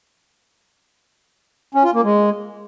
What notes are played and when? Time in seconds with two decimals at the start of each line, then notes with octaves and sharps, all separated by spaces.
1.75 C#4
1.84 F4
1.94 A#3
2.03 G#3